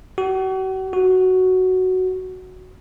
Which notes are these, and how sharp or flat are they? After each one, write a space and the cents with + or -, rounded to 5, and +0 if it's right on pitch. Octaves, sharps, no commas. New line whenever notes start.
F#4 +40
F#4 +5